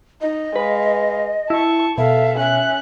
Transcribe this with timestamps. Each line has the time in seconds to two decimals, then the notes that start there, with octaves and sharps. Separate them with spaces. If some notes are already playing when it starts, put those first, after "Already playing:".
0.21 D#4 D#5
0.56 G#3 B4 F5
1.50 E4 A5 C#6
1.98 B2 A4 E5 F5
2.39 C#4 E5 F#6